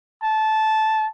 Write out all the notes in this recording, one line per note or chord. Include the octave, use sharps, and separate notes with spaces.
A5